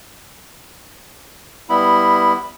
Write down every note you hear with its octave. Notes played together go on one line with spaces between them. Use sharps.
G3 B3 E4 B5